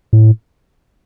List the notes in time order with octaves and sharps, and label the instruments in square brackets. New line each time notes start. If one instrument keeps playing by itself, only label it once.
[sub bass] A2